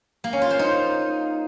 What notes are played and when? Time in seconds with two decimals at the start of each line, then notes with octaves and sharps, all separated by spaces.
0.24 A#3
0.33 C#4
0.42 F4
0.50 C5
0.59 D#4